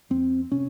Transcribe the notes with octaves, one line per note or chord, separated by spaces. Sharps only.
F2 C4
C3 C#4